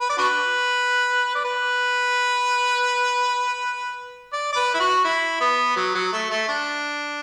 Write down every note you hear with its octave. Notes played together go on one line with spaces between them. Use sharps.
B4
D5
D4 F#4 B4
D5
B4
D5
D5
B4
E4
F#4
E4
B3
F#3
F#3
A3
A3
D4